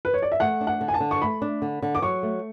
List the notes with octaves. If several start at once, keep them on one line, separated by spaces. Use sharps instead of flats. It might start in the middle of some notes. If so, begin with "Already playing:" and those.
B4
C#5
D5
E5
A3 F#5
D4
F#5
D3
G#5
A5
D3
C#6
A3 B5
D4
D3
D3
D6
F#3 C#6
A3